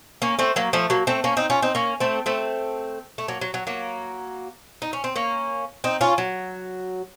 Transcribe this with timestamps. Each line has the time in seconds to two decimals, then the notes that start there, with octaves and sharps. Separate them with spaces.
0.22 A#3 C#4
0.39 A3 C4
0.56 F#3 A#3
0.73 F3 A3
0.90 F#3 A#3
1.07 A3 C4
1.24 A#3 C#4
1.37 C4 D#4
1.50 C#4 F4
1.62 C4 D#4
1.75 A#3 C#4
2.00 A3 C4
2.26 A3 C4
3.18 A3
3.28 F#3 A#3
3.41 F#3
3.54 F#3
3.67 F#3 A#3
4.82 D#4
4.93 C#4
5.04 C4
5.16 A#3 C#4
5.84 C4 D#4
6.01 C#4 F4
6.18 F#3